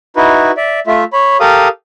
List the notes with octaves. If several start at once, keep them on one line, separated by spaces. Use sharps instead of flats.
D#4 E4 F#4 B4
D5 E5
A3 F4 E5
C#5 B5
G4 A4 A#4 F5 D#6